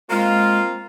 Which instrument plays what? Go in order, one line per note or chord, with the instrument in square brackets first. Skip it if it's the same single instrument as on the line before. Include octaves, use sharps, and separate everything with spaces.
[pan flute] G#3 [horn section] A#3 C4 F4